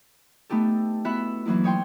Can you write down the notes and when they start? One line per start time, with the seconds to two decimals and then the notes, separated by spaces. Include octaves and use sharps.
0.50 A3 B3 D#4 G4 A4
1.05 B3 E4 F#4 E5 B5 F#6
1.45 E3 F#3 A#3 D#4 E4
1.64 D#4 C#5 G5 C6